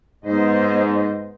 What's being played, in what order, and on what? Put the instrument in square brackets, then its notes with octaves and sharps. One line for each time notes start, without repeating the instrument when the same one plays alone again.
[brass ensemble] G#2 [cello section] B3 C5 D#5